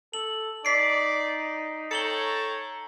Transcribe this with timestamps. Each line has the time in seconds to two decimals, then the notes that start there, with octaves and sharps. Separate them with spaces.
0.13 A4 F#7
0.65 D#4 D5 B6 C7 D7
1.91 A4 C#5 G5 A#5 C#7 F#7 G7